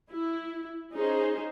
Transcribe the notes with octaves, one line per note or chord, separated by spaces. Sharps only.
E4
C#4 D#4 G#4 C5